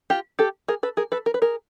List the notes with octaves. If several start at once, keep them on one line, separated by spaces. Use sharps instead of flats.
F4 G4
G4 A4
G#4 A#4
A4 B4
G#4 A#4
A4 B4
A#4
B4
G#4 A#4